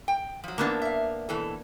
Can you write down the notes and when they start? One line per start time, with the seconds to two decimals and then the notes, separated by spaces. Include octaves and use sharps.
0.08 G5
0.44 F3 F#3
0.58 E2 G#2 A#3 B3 D4 A5
0.82 E5 F5
1.29 B2 E3 A4